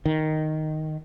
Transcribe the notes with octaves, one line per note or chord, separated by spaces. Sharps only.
D#3